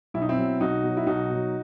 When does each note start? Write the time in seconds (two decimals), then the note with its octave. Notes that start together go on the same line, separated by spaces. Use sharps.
0.14 B1 E4
0.22 D#4
0.29 C4 E4
0.38 B2 F#3
0.60 B1 D#4 F#4
0.83 B2 F#3
0.97 E4
1.07 B1 D#4 F#4
1.30 B2 F#3